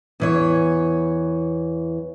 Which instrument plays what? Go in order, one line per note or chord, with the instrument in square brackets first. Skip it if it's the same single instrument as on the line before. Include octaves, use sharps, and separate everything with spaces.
[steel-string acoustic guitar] E2 E3 C#5